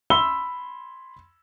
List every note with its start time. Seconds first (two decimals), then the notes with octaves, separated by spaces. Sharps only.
0.10 B5 C6 E6 G7